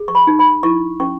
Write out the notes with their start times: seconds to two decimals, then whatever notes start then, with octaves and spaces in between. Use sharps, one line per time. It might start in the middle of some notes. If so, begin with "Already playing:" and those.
Already playing: G#4
0.08 C#6
0.15 B5
0.27 D#4
0.39 B5
0.63 E4 C#6
1.00 C#4 C#6